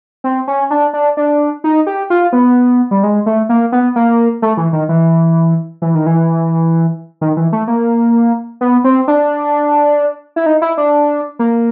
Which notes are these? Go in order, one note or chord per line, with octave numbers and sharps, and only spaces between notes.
C4
C#4
D4
D4
D4
D#4
G4
F4
B3
G3
G#3
A3
A#3
B3
A#3
A3
E3
D#3
E3
E3
D#3
E3
D#3
E3
A3
A#3
B3
C4
D4
E4
D#4
E4
D4
A#3